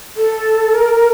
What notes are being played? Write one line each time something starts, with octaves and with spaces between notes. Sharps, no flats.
A4
A#4